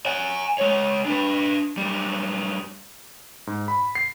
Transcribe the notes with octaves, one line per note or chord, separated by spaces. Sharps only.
F#5 G#5
G#3 C#5
D4 B4
F#2 G3
G#2
B5
C7